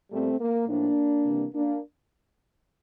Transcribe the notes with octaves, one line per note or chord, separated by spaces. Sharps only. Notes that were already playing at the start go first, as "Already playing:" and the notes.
A#2 G3 A3 C4
A#3
A2 F3 A#3 D4
C3 E3 G3
A#3 D4